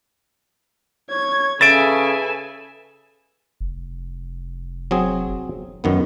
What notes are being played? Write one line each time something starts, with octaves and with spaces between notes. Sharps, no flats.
C#5 G#6
C#3 A4 B4 E5 G#5 A6 D7
F1
F#3 C4 G#4
F#2 D#3 B3